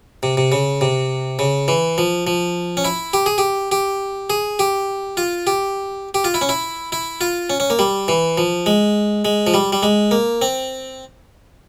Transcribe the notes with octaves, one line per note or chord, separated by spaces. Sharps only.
C3
C3
C#3
C3
C#3
E3
F3
F3
C#4
E4
G4
G#4
G4
G4
G#4
G4
F4
G4
G4
F4
E4
C#4
E4
E4
F4
C#4
C#4
A#3
G3
E3
F3
G#3
G#3
F3
G3
G3
G#3
A#3
C4